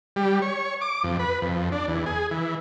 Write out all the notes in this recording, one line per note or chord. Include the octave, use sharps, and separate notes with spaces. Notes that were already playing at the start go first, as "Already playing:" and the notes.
G3
C#5
D6
F2
B4
F2
D4
E2
G#4
E3